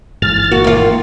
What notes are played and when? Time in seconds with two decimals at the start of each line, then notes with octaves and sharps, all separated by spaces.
0.22 G1 G#2 E3 F6 A6
0.52 A#3 F#4
0.64 D#2 F4